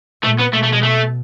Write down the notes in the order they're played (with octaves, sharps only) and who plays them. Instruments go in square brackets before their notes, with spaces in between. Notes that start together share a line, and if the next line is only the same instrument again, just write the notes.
[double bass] A#2 [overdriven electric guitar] A3
[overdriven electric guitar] B3
[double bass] B2 [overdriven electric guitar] A3
[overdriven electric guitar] A3
G#3
A3